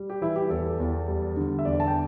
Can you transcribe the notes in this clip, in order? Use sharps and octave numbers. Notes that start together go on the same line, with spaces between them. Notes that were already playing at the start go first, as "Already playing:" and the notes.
Already playing: G3
G4
E3 E4
G4
E2 A4
E2
G3
D3
E5
E2 D5
A5
G5